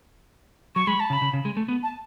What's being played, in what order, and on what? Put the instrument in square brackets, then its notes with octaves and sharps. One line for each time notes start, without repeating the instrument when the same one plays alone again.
[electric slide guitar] F#3 [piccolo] C#6
[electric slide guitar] G#3 [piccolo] B5
[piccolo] A5
[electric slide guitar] C#3
[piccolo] B5
[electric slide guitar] C#3
C#3
G#3
A3
B3
[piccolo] A5